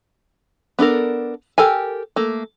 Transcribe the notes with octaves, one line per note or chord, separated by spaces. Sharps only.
B3 D4 A4 A#4
G4 A4 A#4 G#5
A3 A#3